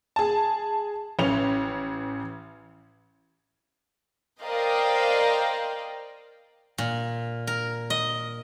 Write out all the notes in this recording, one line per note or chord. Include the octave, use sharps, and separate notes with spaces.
G#4 A5
A1 C#4 F7
A#4 C5 D5 D#5 F5 G5
A#2
A#4
D#5